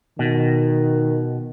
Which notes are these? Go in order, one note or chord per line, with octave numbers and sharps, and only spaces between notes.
B2 D#3